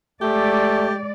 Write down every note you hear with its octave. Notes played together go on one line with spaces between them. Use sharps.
G#3 A3 G4 D5